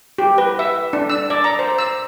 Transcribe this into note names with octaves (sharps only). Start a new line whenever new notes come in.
G4
B4
E5
D4
E6
D5
A#5
C5
E6